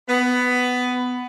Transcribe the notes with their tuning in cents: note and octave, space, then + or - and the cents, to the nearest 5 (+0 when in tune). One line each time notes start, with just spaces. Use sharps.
B3 +10